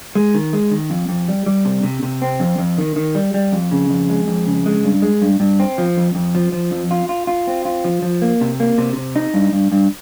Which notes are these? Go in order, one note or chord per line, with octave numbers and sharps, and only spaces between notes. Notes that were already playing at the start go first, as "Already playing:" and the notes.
G#3
D#3
G#3
D#3
F2
F2
G3
G3
C3
C3
C3
C4
F2
F2
D#3
D#3
G3
G3
F2
C#3
F2
G#3
F2
C#3
G#3
G2
G#3
G2
G2
C4
F3
F2
F2
F3
F3
F2
F4
F4
F4
C4
F4
F3
F3
A#3
C3
A#3
C3
C3
D#4
G2
G2
G2